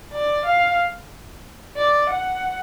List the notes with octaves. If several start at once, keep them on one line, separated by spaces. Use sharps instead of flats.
D5
F5
D5
F#5